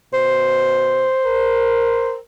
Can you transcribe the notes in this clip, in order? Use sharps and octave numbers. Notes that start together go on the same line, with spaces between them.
B2 C5
A#4